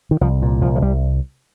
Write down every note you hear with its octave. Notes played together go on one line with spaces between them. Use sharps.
D#3
C2 F3
A#2
C2 F3
F3
C2 G3